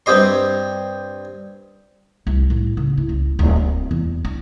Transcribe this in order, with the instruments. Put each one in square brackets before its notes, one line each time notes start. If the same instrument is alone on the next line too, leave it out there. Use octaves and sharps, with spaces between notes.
[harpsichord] G2 C4 G4 D#5 C6
[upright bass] C2
A2
C#3
E4
C#2
D1
C4
E2
D4